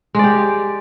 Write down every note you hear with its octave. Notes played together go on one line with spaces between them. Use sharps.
G#3 G4 D5